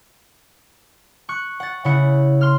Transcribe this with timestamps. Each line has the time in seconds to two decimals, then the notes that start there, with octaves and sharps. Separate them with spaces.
1.29 C#6 F#6
1.60 F#5 A6
1.85 C#3 E4 F#5
2.41 C6 F6